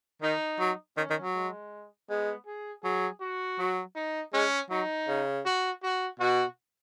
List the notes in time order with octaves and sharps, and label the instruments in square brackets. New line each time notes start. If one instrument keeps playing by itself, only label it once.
[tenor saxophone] D#3 [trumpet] D#4
[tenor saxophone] F#3
[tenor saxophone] D#3 [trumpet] C#4
[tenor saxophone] D#3
F#3
[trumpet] G#3
[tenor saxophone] G#3 [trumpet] B3
[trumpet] G#4
[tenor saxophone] F#3 [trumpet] G#4
[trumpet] F#4
[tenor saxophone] F#3
[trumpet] D#4
[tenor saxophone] G#3 [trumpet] C#4
[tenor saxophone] F#3 [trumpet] D#4
[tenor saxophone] C#3
[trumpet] F#4
F#4
[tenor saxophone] B2 [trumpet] F#4